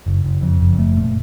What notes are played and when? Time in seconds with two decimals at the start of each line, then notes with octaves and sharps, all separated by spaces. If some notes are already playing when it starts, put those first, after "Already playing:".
0.06 F#1
0.24 F#1
0.42 F2
0.61 F#1
0.79 A3
0.97 A#2